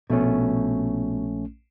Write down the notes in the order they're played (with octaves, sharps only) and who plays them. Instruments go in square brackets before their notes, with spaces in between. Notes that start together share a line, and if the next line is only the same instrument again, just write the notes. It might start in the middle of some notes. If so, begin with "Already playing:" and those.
[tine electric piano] A#1 A3 C#4 [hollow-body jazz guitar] B2